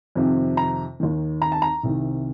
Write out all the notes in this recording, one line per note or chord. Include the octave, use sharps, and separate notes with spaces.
F2 C3 D#3
A#5
D#2 D#3
A#5
A5
A#5
C2 C3 D#3